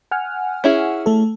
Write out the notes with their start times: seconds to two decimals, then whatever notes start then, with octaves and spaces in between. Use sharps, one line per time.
0.11 F#5 G#5 F6
0.64 C#4 E4 G#4
1.06 A3 A4